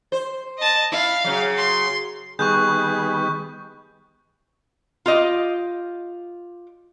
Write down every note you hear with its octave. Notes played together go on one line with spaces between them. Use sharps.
C5
D#5 A5
E4 F5
C#3 F#3
C6
D#3 G3 B3 G#4 C#6 F#6 G6
F4 G4 D#5